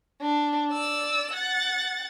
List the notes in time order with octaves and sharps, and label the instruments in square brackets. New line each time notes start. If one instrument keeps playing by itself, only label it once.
[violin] D4
D5 E6
F#5 A6